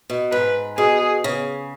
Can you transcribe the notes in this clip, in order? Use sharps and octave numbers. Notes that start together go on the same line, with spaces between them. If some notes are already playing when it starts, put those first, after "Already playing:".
B2
G#2 B4
B2 G#4
C#3